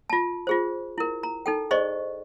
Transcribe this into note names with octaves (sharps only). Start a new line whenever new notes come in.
F4 A5
F4 G#4 C5
E4 A#4
A#5
D#4 A4 G5
G#4 C5 D5 D#5 C#6